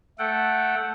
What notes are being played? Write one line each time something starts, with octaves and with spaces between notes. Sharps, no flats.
A3 A4 F#5 G5